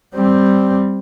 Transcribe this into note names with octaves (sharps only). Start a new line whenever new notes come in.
G3 C4